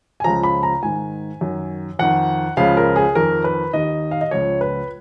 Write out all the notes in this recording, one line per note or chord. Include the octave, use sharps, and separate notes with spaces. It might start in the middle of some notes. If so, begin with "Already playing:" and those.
G#5
C#2 C#3 F3 A#5
B5
A#5
G#2 D#3 G#5
F#2 D#3
F2 D#3 F#5
C#2 C#3 F3 F5
A#4
G#4
F2 D#3 A#4
B4
D#2 D#3 D#5
F5
D#5
C#2 C#3 F3 C#5
B4